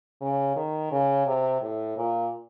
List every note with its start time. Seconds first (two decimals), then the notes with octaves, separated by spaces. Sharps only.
0.22 C#3
0.56 D#3
0.92 C#3
1.27 C3
1.61 A2
1.97 A#2